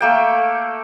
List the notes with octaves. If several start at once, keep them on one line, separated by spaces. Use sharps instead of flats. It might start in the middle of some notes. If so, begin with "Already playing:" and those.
A3 A#3 G5